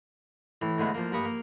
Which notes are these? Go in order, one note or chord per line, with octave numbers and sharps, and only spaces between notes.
A2 E3
A2 D3 G#3 B3
F3 A#3
G2 A#3 B5 C#6 D#6
A#3